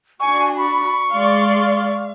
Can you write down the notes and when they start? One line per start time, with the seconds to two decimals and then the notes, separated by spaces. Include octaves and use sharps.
0.20 D4 F#4 G#5 C#6
0.58 B5 C#6
1.11 G#3 D5 F5 C6